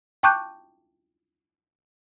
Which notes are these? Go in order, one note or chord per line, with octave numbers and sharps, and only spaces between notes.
G5 A5 C#6 D6 F#6 G6